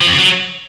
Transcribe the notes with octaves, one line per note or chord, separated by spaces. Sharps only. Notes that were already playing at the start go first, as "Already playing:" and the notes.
F3
F2
C#3
F#3